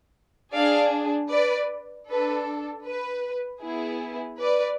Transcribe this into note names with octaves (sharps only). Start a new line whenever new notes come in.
D4 G#4 D5 F5
B4 D5
D4 A4 B4
B4
B3 E4 G#4
B4 D5